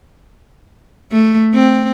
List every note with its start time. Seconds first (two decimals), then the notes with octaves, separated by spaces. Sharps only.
1.12 A3
1.54 C4